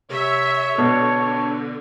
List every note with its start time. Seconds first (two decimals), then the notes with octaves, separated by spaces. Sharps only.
0.12 C3 C#5 E5
0.78 B2 D3 A4